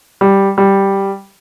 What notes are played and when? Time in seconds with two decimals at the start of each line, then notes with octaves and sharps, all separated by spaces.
0.21 G3
0.58 G3